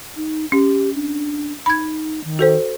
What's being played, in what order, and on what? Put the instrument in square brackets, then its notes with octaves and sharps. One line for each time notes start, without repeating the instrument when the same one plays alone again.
[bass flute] D#4
[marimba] C#4 [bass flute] G4
[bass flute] D4
[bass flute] D#4 [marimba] B5 G#6
[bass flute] D#3
[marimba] F#4 A4 C5